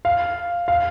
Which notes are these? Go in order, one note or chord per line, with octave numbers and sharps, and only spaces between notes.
F5
F5